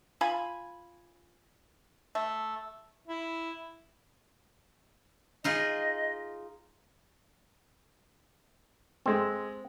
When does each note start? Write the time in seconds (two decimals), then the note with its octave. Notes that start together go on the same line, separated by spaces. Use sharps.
0.21 F4 G#5 B5
2.15 A3
3.08 E4
5.44 D#4 F4 G#4 D#5
9.06 G#3 C4 A4